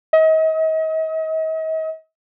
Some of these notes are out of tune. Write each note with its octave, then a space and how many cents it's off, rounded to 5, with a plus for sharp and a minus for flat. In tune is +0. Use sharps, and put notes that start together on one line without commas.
D#5 +40